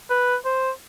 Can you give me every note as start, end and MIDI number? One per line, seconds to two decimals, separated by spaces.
0.10 0.36 71
0.45 0.71 72